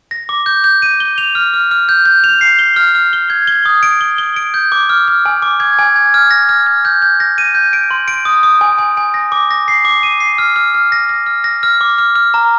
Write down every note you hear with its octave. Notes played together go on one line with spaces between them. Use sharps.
A#6
D6
G6
G6
D#7
G7
F7
F6
F6
F6
G6
G6
F7
C7
G7
F6
F6
G7
G#6
G7
D#6
D7
G7
G7
D7
G6
D6
F6
F6
G#5
D6
G#6
G#5
G#6
F6
A#6
F6
F6
G6
G6
A#6
D#7
G6
D7
C6
D7
D#6
D#6
G#5
G#5
G#5
A#6
D6
A#6
C7
D6
D#7
C7
F6
F6
F6
A#6
A#6
F6
A#6
F6
D6
F6
F6
A#5